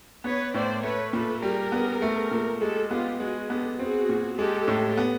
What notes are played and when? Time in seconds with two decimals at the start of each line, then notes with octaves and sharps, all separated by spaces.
0.24 B3 B4 C#5
0.54 A2 C5 D5
0.83 A3 B4 C#5
1.13 A#2 A4 B4
1.42 G3 G#4 A#4
1.72 B3
2.02 A3
2.31 A#2
2.60 G#3 G4 A4
2.91 B3 F4 G4
3.20 G#3 F#4 G#4
3.50 B3 G4 A4
3.79 C4 F#4 G#4
4.09 A#2
4.38 G#3 G4 A4
4.68 A2
4.97 B3